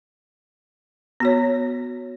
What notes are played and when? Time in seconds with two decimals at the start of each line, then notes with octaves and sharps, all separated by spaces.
1.20 B3 F#4 C#5